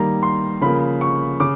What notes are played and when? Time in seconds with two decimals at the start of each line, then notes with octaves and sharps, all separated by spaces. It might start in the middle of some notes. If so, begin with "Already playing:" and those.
Already playing: D#3 G3 A#3 A#5
0.23 C6
0.61 C#3 F3 A#3 B5
1.01 C#6
1.40 C#3 D6